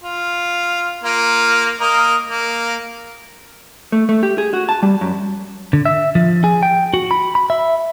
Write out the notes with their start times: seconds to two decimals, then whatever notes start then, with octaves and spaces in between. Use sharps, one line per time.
0.03 F4
1.04 A#3 F4
1.80 A#3 A#4 D#5
2.29 A#3
3.92 A3
4.09 A3
4.23 G4
4.38 G#4
4.53 F#4
4.69 A5
4.83 G3
5.01 F#2
5.73 D3
5.85 E5
6.15 F3
6.44 G#4
6.63 G5
6.94 F#4
7.11 B5
7.35 B5
7.50 E5